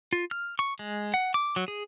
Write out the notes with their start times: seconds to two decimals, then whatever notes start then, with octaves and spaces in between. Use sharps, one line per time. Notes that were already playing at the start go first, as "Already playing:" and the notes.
0.13 F4
0.31 F6
0.59 C#6
0.79 G#3
1.14 F#5
1.34 D6
1.56 F#3
1.68 G#4